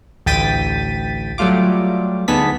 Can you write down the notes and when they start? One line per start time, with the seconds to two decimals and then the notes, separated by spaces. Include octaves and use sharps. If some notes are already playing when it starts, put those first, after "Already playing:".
0.26 A1 D2 G5 A6 B6 D#7
1.38 F#3 G3 A3 F4 D6
2.28 D2 B3 D#4 G#4 A5 B6